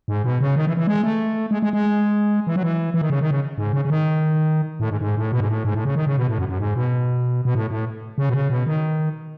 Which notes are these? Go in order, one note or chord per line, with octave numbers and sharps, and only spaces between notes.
G#2
B2
C#3
D#3
E3
E3
G#3
A3
G#3
G#3
G#3
E3
F#3
E3
E3
D#3
C#3
D#3
C#3
G#2
C#3
C#3
D#3
A2
G#2
G#2
A2
B2
G#2
A2
G#2
A2
C#3
D#3
C#3
B2
A2
F#2
F#2
G#2
B2
B2
A2
A2
C#3
B2
C#3
B2
D#3